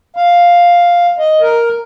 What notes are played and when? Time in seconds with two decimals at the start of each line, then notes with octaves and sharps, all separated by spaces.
0.17 F5
1.19 D#5
1.41 A#4